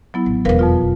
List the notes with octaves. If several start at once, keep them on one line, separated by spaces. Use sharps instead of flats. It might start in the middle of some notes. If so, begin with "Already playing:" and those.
F#3 B3 E4
A1
E1 E2 A#4 B4 F5
F2 B2 F4